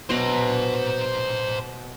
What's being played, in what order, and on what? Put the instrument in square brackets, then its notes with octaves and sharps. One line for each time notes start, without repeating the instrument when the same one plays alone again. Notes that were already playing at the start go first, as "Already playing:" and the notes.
[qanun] B2 F#3 [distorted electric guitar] C5 A#5